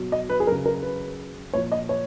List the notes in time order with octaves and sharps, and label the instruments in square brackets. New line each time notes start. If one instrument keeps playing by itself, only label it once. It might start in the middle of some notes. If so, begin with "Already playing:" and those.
Already playing: [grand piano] B2 F#3
D#5
B4
G#4
C#3 F#3 A#4
A#4
B4
A#2 F3 C#5
D#5
C#5